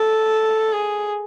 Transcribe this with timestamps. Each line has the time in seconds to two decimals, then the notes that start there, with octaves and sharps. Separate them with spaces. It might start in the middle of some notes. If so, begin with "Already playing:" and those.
Already playing: A4
0.73 G#4